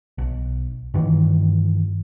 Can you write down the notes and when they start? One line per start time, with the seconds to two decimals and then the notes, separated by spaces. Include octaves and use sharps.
0.18 B1
0.94 G2 D#3 E3